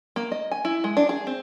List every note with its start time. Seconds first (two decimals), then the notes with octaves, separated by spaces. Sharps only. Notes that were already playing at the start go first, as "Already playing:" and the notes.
0.16 A#3
0.32 D#5
0.51 G#5
0.65 E4
0.84 G#3
0.97 D4
1.09 G#4
1.27 C4